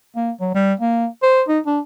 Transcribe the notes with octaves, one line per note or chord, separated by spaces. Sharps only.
A#3
F#3
G3
A#3
C5
D#4
D4